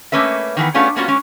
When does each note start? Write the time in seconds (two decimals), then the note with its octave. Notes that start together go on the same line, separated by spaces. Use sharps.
0.12 A3 A#3 C#4 B4 E5
0.57 D#3 E3 B3
0.74 A3 B3 C#4 D4 F4 G#4
0.96 G3 A#3 B3 C#4 F4 F#4
1.08 G#3 C#4